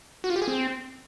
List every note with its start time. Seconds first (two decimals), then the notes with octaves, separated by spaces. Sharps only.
0.24 F#4
0.30 F4
0.36 G4
0.42 G#4
0.48 C4